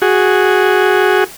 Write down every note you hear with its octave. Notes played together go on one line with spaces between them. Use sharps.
F#4 G#4